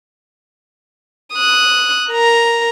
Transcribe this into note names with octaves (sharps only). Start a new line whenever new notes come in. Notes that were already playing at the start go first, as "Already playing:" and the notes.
D#6 F#6
A#4 A#5